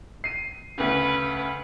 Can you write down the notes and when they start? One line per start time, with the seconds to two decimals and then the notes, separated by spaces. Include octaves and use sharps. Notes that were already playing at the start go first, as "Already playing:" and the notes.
0.24 C7 D#7
0.78 D2 C#3 B4